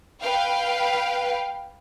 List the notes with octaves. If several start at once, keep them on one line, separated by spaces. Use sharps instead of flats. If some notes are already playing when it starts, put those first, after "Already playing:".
B4 F5 G5